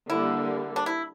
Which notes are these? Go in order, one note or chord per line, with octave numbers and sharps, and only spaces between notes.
D3 G3 A#3 E4
D4
E4